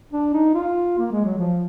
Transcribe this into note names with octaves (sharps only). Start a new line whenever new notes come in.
D4
D#4
F4
A#3
G#3
F#3
F3